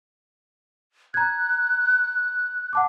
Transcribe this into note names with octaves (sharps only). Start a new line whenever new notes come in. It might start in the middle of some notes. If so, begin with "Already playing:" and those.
A#5 F#6 G#6
F#5 A5 D6